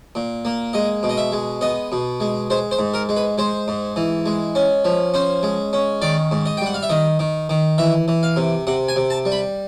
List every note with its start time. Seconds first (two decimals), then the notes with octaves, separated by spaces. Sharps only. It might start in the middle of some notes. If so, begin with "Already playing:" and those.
0.15 A#2
0.45 A#3
0.73 G#3 D#5
1.03 B2
1.09 D#5
1.18 E5
1.32 G#3
1.61 B3 D#5
1.92 B2
2.20 G#3
2.50 G#3 C5
2.71 C5
2.79 G#2
2.94 A#4
3.09 G#3
3.17 B4
3.38 G#3 C5
3.68 G#2
3.96 E3
4.26 G#3
4.55 C#4
4.85 F3
5.14 C#4 C5
5.43 G#3
5.73 C#4
6.02 D#3 D5
6.31 G#2
6.46 D#5
6.57 G5
6.61 G3 F#5
6.74 F5
6.83 E5
6.90 D#3 D#5
7.19 D#3
7.49 D#3
7.78 E3 E5
8.08 E3
8.23 F5
8.36 C3
8.67 C3 F#5
8.88 G#5
8.96 C3
9.10 A5
9.25 G3
9.32 B5